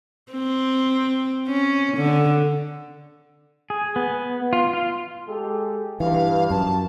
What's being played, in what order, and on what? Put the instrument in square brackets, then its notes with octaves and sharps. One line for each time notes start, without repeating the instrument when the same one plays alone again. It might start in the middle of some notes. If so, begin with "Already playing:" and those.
[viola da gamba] C4
C#4
D3
[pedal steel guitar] G#4
B3
F4
F4
[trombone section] G#3 G4 A4
[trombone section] G2 [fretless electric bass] E3 [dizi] F5
[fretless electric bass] F#2 [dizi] A5